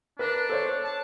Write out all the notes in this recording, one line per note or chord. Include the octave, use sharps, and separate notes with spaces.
D4 A#4 B4
A4 C5 C#5
A5